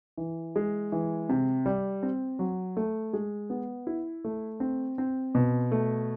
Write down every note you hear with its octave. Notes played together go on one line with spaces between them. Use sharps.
E3
G#3
E3
C3
G3
C4
F#3
A3
G#3
B3
E4
A3
C4
C4
B2
A3